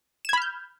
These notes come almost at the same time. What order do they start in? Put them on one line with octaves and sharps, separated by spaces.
E7 G#6 B5 F6 G6